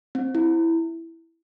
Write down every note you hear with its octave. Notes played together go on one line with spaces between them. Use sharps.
C4
E4